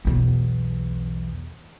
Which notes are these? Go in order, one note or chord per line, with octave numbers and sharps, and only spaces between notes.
B1 E2